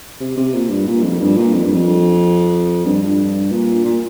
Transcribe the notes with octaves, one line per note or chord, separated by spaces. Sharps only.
C3
C3
A#2
G2
A#2
F2
G2
A#2
F2
G2
F2
G2
G2
A#2
A#2